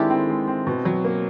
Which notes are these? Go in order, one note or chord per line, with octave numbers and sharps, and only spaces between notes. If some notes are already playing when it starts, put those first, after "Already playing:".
Already playing: D#3 G#3 C4 D4 E4 G4 A4
C4
G#3
C4
B2
F#3
A#3